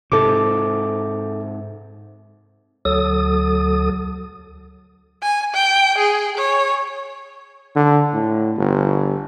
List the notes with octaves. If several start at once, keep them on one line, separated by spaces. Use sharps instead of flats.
G#2 C3 A4 D6
D2 F#3 A4 D#6
G#5
G5
G#4
C#5
D3
A2
G1